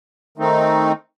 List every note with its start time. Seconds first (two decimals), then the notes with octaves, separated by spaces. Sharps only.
0.37 D#3 A3 C4 D#4